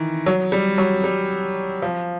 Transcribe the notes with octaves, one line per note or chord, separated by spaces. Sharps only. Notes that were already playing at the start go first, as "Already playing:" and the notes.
Already playing: D#3 E3
F#3
G3
F#3
G3
F3